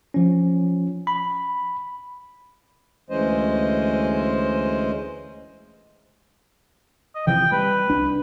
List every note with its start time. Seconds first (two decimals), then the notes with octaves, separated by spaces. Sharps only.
0.14 F3 C#4
1.07 B5
3.10 D2 E3 G#3 C#4 C5 D#5
7.15 D#5
7.27 C3 E3 F3 G5
7.52 G3 B4
7.90 C2 D4